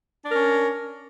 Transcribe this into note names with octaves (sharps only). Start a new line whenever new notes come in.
C#4 D4 A#4